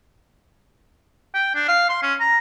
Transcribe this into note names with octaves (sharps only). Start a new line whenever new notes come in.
G5
D4
F5
C6
C#4
A#5